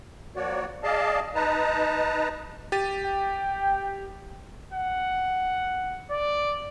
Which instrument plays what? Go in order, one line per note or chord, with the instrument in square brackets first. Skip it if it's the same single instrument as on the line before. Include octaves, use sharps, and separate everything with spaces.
[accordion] F3 A#3 F#4 C#5 D5
G#4 D5 D#5 F5 A5
D#4 B4 A5 A#5
[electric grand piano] G4 A6 D#7
[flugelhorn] G5
[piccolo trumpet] F#5
D5